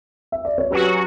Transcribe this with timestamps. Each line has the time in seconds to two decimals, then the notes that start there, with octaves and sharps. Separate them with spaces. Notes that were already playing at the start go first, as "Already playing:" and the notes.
0.32 E5
0.45 D5
0.58 C#5
0.71 F#3 C#4 F#4 G4 B4